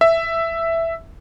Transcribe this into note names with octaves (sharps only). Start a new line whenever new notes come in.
E5